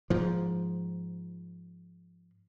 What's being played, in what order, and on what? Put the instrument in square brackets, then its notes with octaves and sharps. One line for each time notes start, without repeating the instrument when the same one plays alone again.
[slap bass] G#2 F3